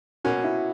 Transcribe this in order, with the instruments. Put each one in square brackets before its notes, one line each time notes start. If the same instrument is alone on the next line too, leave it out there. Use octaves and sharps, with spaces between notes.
[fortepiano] B2 A#3 C#4 [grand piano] F#4
[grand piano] E4